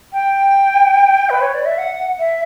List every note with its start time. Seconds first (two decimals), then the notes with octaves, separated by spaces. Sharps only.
0.13 G5
1.30 B4
1.41 C#5
1.54 D5
1.65 E5
1.78 F#5
2.19 E5